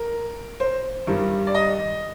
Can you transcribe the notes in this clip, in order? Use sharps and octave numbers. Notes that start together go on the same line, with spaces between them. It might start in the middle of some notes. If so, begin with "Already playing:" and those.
Already playing: A#4
C5
G2 D#3 G3
D5
D#5